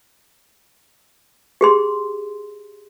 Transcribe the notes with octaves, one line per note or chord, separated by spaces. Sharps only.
G4 G#4 C6